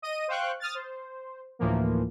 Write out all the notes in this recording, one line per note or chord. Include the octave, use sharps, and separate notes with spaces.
D#5 D#7
C5 F5 G5 C#6 F#6
D#6 F6 A6
C5
D2 A2 E3 F3 A#3